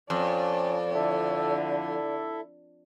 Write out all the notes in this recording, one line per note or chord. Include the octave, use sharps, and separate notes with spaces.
F2 C#4 D5 A5
D3 E4 A4 E5